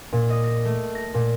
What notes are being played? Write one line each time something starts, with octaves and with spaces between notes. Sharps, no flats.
A#2
D#5
A#6
A3
A#6
A#2